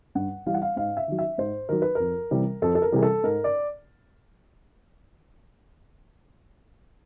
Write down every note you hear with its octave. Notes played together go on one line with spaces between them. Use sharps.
G2 F#5
E3 G3 F5
F#5
F5
G#2 F5
E5
D#3 F#3
E5
G#2 C5
D#3 F#3 A#4
B4
F2 A#4
C3 E3 G3
F2 A4
A4
A#4
C3 E3 G3 G#4
A4
G#2 A#4
D5